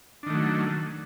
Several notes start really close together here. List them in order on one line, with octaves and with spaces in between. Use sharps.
D4 D#3 A3 F#3